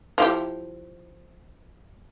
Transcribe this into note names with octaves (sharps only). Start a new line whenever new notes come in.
F3 E4 G4